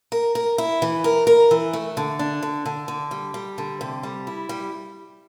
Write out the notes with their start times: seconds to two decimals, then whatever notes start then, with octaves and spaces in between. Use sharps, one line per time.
0.12 A#4
0.35 A#4
0.58 E4
0.82 E3
1.04 A#4
1.27 A#4
1.51 E3
1.73 A3
1.97 D3
2.19 D4
2.42 D3
2.66 D3
2.88 D3
3.11 G3
3.34 G3
3.58 D3
3.81 C3
4.03 G3
4.27 E4
4.49 G3